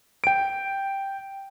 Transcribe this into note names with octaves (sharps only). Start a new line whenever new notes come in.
G5 D7